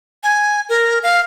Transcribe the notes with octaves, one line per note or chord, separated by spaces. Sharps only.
G#5
A#4
F5